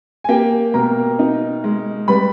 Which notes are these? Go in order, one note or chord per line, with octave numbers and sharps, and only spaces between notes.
G#5
A#3 G4 G5
B2 A#4 A#5
D#4
G#3
G3 B4 B5